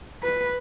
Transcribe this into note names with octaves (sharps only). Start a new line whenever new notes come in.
B4